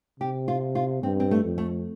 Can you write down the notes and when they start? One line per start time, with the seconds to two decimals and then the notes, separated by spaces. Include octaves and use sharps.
0.20 C3 G4
0.48 F4
0.75 F4
1.03 G2 C4
1.20 C4
1.31 A3
1.44 F2
1.58 A3